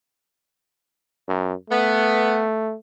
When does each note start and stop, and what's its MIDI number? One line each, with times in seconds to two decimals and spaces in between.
1.28 1.54 42
1.70 2.75 57
1.70 2.42 59